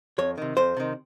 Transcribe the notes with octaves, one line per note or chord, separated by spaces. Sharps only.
F2 C#5
C3 D#3
F2 C5
C3 D#3